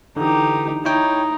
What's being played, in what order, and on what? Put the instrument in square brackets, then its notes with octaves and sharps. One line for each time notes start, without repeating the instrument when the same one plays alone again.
[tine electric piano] D3 E3 [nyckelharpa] D#4 G4
[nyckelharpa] D#4 [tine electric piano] E4 C#5 G5